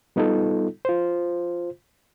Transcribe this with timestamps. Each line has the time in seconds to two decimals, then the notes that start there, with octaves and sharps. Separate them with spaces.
0.16 G3 B3 D#4 F4 A4
0.85 F4 C5